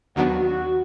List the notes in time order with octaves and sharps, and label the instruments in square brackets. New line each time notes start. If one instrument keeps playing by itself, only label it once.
[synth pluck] D#2 D#3 F#3 B3 D4 [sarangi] F#4
[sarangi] F#4